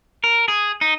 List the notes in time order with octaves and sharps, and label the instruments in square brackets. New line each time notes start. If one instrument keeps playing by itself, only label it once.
[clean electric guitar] A#4
G#4
D#4